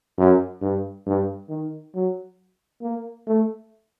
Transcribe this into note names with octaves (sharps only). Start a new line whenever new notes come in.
F#2
G2
G2
D#3
F#3
A#3
A3